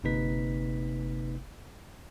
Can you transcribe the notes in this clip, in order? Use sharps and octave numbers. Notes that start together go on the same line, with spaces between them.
G1 C3 A#3 D#4 B4 B6